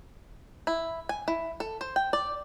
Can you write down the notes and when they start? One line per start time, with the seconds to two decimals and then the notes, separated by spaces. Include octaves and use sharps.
0.67 E4
1.09 G#5
1.28 E4
1.60 A4
1.81 C5
1.96 G5
2.13 D5